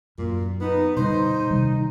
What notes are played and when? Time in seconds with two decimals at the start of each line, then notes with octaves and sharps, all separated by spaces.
0.18 F#2 A#2
0.61 B3 D#4
0.96 B2 D3 G3 D#4 C5
1.51 C3 D#3 G3